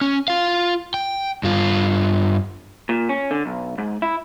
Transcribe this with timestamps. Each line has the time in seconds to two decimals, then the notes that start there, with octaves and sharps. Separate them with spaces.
0.01 C#4
0.28 F4 F5
0.94 G5
1.43 G2 F4
2.89 A#2
3.09 C#4
3.31 D3
3.46 B1
3.78 G#2
4.02 E4